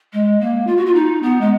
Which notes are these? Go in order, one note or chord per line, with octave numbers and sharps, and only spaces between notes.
G#3
A#3
F4
F#4
F4
D#4
B3
G#3